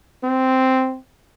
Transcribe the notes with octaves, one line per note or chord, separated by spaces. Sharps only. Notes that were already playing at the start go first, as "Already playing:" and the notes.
C4